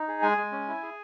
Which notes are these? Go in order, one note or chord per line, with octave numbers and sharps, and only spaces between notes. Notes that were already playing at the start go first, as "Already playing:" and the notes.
Already playing: D#4
G#4
G#3 G#5
G#3
C#4
E4
G#4